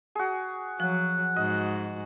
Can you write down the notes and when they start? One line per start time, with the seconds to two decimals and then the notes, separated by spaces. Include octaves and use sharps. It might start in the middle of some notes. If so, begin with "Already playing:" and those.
0.15 F#4 G#4
0.80 F3 F#3 F#5
1.36 G#2 F#4 D#5